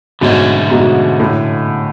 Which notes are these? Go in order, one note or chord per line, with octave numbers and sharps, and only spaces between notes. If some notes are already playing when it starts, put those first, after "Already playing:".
G#2 B2 D3 A3 C#4 F#4
G#2 B2
A2